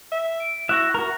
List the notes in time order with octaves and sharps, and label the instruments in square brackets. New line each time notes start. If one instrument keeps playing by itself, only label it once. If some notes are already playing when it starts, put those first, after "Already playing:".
[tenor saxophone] E5
[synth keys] D7
[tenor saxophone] E4 [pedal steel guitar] F#4 E5 [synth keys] F#6 A#6
[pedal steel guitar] F#4 A#4